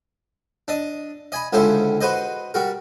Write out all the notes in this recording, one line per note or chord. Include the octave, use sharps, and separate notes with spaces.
D4 D#5
D#5 G#5 B5
C#2 D3 C#4 E4 C5
F#4 B4 C5 D#5
G3 F#4 A#4